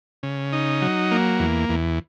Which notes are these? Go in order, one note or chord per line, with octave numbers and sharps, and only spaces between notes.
C#3
D#4
F#3
A#3
E2
E2